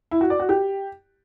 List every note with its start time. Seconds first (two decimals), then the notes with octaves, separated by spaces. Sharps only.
0.11 E4
0.21 F#4
0.30 D5
0.40 F#4
0.49 G4